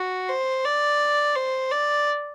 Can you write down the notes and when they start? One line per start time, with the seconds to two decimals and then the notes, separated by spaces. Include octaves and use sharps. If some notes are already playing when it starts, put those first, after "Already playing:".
Already playing: F#4
0.29 C5
0.65 D5
1.36 C5
1.71 D5